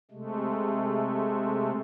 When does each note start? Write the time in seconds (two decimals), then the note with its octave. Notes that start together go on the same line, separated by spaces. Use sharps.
0.11 C3 G#3 A3